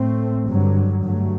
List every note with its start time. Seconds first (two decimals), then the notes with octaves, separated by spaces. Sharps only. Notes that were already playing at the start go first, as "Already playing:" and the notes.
Already playing: A2 A3 C4
0.47 G2 D3 F#3
1.04 G2 F#3 A3